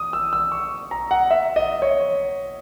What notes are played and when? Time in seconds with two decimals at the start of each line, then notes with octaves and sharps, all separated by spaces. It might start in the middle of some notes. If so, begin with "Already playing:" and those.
Already playing: D#6
0.13 E6
0.33 E6
0.52 C#6
0.91 A#5
1.11 F#5
1.31 E5
1.56 D#5
1.82 C#5